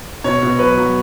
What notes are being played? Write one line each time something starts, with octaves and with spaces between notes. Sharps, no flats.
B2 C#5
B2
F#3 B4
F#3